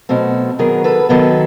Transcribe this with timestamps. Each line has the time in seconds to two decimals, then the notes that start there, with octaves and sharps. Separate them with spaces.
0.09 B2 F#3 A3 C4
0.59 D#3 F#3 B3 G#4 A#4
0.84 A4 B4
1.09 D#3 F#3 B3 A4 B4